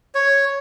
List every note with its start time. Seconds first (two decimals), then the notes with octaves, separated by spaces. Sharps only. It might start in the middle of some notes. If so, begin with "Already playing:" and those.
0.15 C#5